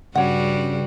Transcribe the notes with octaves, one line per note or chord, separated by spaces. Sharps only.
G2 C#3 G3 F#4 C#5 F#5